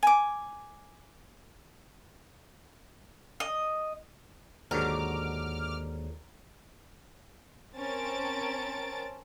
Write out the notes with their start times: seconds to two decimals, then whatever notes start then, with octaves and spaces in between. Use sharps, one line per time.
0.03 G#5 D6
3.40 D#5
4.71 D#2 G#2 D3 F#3 D#4 A#4 D6 F6
7.76 C4 C#4 A#4 A5 A6 D7